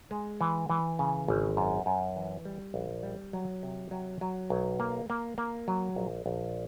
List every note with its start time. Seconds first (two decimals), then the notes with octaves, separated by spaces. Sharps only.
0.11 G#3
0.41 E3
0.70 E3
0.99 C#3
1.28 G#1
1.57 F#2
1.86 F#2
2.16 E3
2.45 G3
2.74 A#1
3.03 G3
3.33 F#3
3.63 C3
3.91 F#3
4.21 F#3
4.50 B1
4.80 A#3
5.10 A#3
5.38 A#3
5.68 F#3
5.96 A#1
6.26 A#1